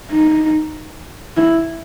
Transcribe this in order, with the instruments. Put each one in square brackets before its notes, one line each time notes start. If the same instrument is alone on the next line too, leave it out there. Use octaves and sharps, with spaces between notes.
[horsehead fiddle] D#4
E4